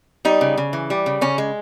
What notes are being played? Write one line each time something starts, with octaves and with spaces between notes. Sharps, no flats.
G3 D#4
C#3
C#3
E3
G3
C#3
C#3 C#4
G#3